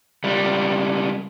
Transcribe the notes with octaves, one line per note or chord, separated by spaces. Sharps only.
C#2 G3